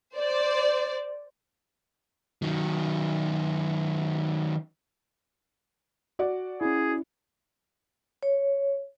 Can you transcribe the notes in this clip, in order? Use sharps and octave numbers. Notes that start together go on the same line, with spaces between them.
C5 D5
D#3 F#3
F#4 D5
C#4 E4 G#4
C#5